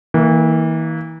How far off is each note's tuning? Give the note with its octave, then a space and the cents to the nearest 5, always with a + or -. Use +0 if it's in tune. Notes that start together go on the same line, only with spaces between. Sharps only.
E3 -35 A#3 -10